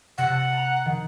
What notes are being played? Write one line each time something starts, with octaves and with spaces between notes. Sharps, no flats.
C3 F#5
A5
A5 A#5
D#3